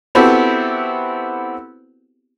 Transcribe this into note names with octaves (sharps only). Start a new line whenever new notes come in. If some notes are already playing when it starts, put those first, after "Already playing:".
B3 C4 E4 F#4 G4 A4